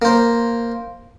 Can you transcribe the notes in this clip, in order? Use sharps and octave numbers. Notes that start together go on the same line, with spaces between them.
A#3 C5